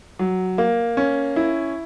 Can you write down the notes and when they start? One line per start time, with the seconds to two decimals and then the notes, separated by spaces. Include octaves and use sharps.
0.19 F#3
0.58 A#3
0.97 C#4
1.36 E4